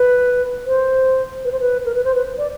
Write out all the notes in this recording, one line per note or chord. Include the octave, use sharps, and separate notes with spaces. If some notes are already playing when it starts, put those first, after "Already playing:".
Already playing: B4
C5
B4
C5
B4
A#4
B4
C5
B4
D5